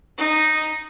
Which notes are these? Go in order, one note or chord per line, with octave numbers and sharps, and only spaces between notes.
D#4